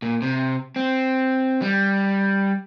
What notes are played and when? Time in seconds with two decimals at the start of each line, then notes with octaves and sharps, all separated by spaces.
0.02 A#2
0.22 C3
0.76 C4
1.62 G3